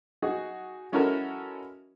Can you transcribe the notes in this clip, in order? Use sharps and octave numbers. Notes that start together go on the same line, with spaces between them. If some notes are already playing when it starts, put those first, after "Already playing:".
D#4 F#4 G#4
G#3 C#4 E4 F#4 A4 A#4